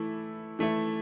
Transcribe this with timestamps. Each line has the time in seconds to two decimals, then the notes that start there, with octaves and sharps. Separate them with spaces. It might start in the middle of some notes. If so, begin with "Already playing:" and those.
Already playing: E3 A3 E4
0.59 E3 A3 E4